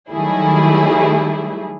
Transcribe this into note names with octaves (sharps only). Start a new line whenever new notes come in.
D#3 F#3 G3 A3 E4 G#4